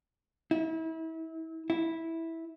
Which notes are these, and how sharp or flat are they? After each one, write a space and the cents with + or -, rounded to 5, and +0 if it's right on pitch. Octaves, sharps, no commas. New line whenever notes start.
E4 -35
E4 -10